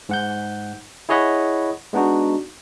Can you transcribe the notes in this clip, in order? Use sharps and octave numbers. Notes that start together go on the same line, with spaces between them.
G#2 F#5 G6
E4 G#4 C#5 D#5 F#5 B5
G#3 B3 D4 D#4 F#4